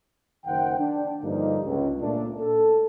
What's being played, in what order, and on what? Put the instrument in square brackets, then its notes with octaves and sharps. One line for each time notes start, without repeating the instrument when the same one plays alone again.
[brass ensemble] F#1 D#3 C5 F#5 G5
D4
G2 D3 F3 G3 A#3 D#4
C#2
A#2 A3 D4
A4